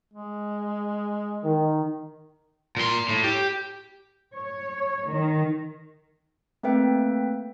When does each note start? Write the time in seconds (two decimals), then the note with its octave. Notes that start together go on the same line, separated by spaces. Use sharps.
0.13 G#3
1.44 D#3
2.77 A#2 C6
3.09 A2
3.24 G4
4.36 C#5
5.11 D#3
6.63 A3 A#3 C4 B4 E5 G5